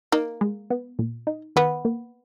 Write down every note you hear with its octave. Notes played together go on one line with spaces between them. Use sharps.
A#3 D#4
G#3
B3
A#2
D#4
D#3 B3
A#3